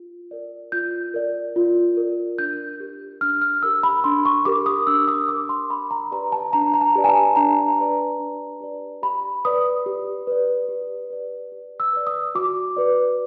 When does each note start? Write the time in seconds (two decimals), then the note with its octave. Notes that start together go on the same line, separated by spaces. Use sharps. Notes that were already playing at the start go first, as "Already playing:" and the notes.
Already playing: F4
0.31 A#4 D5
0.72 F4 G6
1.14 A#4 D5
1.56 F4
1.97 A#4 D5
2.38 D4 G6
2.80 G4 A#4
3.21 D4 F6
3.42 F6
3.63 G4 A#4 E6
3.83 B5
4.04 D4 C6
4.25 C#6
4.45 G4 A#4 D6
4.66 D#6
4.87 D4 E6
5.08 D#6
5.29 G4 A#4 D6
5.49 C6
5.70 D4 B5
5.91 A#5
6.11 G4 B4 D5 A#5
6.32 A5
6.53 D4 A#5
6.74 A#5
6.81 A5
6.95 G4 B4 D5
7.04 G#5
7.09 A5
7.36 D4 A#5
7.79 G4 B4 D5
8.19 D4
8.61 G4 B4 D5
9.02 G4 B5
9.45 B4 D5 D#6
9.86 G4
10.27 B4 D5
10.69 G4
11.10 B4 D5
11.52 G4
11.80 E6
11.93 B4 D5
12.07 D#6
12.35 F#4 D6
12.77 B4 D5